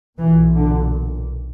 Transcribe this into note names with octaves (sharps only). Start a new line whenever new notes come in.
B1 A#2 E3
D3